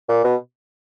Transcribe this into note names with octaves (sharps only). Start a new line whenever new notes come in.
A#2
B2